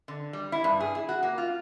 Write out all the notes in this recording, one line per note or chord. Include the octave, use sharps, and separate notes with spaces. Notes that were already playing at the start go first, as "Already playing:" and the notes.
D3
G3
E4
G2
G#4
E4
F#4
A#3
F4